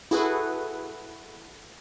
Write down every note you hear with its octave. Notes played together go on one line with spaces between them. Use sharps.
E4 F#4 G#4 A4 B4